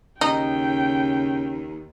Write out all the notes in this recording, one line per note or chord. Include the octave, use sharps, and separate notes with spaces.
D#2 C#3 D#4 G5